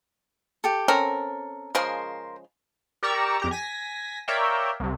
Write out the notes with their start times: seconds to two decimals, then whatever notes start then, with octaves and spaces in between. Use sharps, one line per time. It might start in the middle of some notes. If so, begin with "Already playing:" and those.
0.64 G4 A4
0.88 C4 C#4 A4 A#4
1.75 C#3 F3 G#3 A#4 C5 C6
3.03 G4 A#4 D5 A#5 C#6 E6
3.40 F2 G4 A#5
3.51 G#5 A#6 B6
4.28 A#4 C#5 D5 E5 F5 G5
4.80 C2 C3